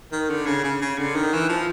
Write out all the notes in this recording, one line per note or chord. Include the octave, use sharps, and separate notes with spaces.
D#3
D3
C#3
C#3
C#3
D3
D#3
E3
F3